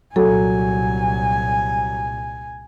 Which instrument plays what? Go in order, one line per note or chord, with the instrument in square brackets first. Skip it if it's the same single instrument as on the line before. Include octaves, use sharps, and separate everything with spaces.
[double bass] C2 A#2 [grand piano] F#3 [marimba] A4 [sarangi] G#5